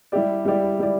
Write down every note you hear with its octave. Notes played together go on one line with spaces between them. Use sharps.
G3 E4 G4 D5
G3 E4 G4 D5
G3 E4 G4 D5